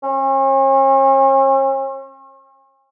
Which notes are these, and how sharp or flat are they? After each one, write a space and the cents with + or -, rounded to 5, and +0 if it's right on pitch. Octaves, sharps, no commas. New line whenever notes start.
C#4 -45